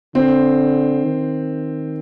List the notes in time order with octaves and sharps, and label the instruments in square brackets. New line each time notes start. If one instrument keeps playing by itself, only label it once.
[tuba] D3 [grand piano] C4
[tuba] D#3